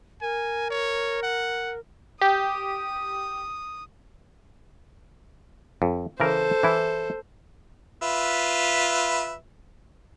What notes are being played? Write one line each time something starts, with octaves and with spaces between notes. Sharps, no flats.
A#4 G#5
C#5
F#5
G4 D#6
F2
C#3 E3 A4 A#4 C5
E3 E4
F4 B4 E5